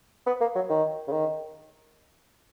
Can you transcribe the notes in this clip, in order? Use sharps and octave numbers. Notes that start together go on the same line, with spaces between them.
B3
A#3
F#3
D#3
C#3
D#3